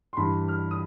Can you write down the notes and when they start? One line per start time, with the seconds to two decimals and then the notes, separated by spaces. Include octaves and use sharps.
0.13 C6
0.17 G2 E3 B5
0.48 F6
0.71 D#6